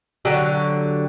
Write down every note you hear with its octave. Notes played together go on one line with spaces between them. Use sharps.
D3 F#3 G4